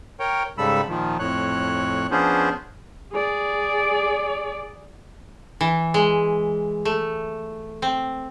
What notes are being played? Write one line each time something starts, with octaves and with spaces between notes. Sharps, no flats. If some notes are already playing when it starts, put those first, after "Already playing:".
A#4 C#5 G5
G#2 C#3 G3 A4 B5 E6
A#2 D#3 F3
F2 A2 C#5 F#6
F3 B3 C#4 D4 G#4 C5
G#4 D5
E3
G#3
A3
C4